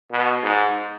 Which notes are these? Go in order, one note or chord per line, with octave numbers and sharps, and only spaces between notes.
B2
G#2